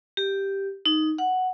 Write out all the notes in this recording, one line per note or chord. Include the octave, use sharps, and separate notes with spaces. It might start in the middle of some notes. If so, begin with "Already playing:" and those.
G4
D#4
F#5